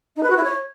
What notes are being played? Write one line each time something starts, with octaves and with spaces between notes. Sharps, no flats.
D#4
B4
F#4
E4
C#5